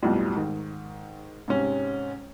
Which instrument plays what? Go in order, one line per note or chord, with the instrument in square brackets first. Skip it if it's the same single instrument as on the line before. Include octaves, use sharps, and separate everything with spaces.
[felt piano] B1 F2 A2 G3
G#2 D#3
G#2 C3 C#4